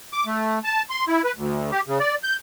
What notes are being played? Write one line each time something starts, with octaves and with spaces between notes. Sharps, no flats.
D6
A3
A5
C6
E4
B4
D2
G4
C#3
D5
G6